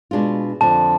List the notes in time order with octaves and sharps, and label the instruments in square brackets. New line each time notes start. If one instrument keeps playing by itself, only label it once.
[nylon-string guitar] B2 G#3 D4 F4
[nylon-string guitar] F2 D3 F3 [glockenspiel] A5